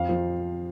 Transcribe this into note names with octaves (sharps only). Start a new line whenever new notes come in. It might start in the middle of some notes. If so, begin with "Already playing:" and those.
Already playing: F2 F5
F3